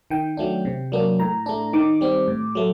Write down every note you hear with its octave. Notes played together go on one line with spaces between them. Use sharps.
D#3 G5
F#3 A3 D4
C3
F#3 A#3 D4
A2 A#5
A3 D4
D#3 D6
G3 C4
A2
F#3 A3